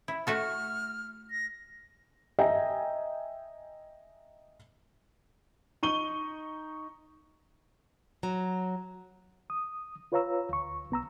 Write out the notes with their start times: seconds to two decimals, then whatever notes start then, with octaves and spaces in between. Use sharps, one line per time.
0.08 E4
0.27 A3 F#4 A4 F6
1.31 A#6
2.39 D#5 E5 G5 G#5 A#5
5.83 D#4 C#6 D#7 G7
8.23 F#3 A#5
9.50 D#6
10.12 F4 B4 C#5 F5 A#5 E6
10.49 D2 C#6
10.90 C2 B3 A#5 E6